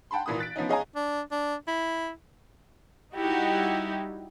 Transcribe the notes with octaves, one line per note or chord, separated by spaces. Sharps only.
F#5 G5 A5 B5 C6
G#1 A#2 E3 B5 D#6
F#6 A6 B6 D7
F3 B3 C#4 D#4
G#4 C#5 D#5 F5 G#5 A#5
D4
D4
E4
G3 D#4 E4 F#4 G4